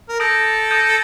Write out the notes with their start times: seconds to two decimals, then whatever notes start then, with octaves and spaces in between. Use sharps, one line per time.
0.09 A#4
0.20 A4 D#6 G6 A#6 D7
0.71 D#6 G6 A#6 D#7